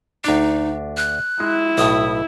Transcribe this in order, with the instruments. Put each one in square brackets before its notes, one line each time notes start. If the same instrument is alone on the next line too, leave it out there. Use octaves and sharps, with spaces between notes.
[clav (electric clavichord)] D2 D4 [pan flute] D#4
[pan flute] F#6
[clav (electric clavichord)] G#3 [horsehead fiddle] E4
[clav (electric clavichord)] B1 A2 [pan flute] D#6